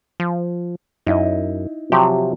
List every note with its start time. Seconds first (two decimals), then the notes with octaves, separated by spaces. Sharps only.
0.20 F3
1.06 F#2 D#4 E4 D#5
1.92 C3 F3 F#3 G4